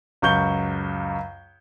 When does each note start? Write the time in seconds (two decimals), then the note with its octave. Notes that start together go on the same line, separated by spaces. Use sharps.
0.22 C#2 F#2 C#6 G6 G7